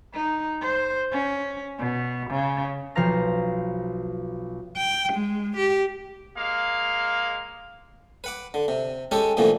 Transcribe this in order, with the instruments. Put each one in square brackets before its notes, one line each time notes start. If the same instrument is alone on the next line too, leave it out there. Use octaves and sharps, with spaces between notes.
[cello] D#4
C5
C#4
B2
C#3
[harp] B1 F3 C5 F5 A#5 A#6
[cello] G5
G#3
G4
[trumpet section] G#3 A#3 F5
[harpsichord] B4 F#5 D6
D3
C3
G#3 C#4 G4 A4
C2 F2 A#2 D3 E3 A3